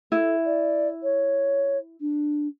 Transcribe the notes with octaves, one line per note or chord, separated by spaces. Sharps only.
E4 A4
D5
C#5
D4